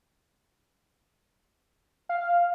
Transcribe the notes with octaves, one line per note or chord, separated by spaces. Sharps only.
F5